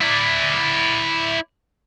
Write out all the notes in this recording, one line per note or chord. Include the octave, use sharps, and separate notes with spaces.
E4 D5